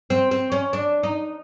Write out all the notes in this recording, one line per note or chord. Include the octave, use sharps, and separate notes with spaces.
C4
C4
C#4
D4
D#4